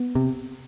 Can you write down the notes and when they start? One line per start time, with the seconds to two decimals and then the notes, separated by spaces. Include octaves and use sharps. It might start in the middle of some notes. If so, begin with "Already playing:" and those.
Already playing: B3
0.15 C3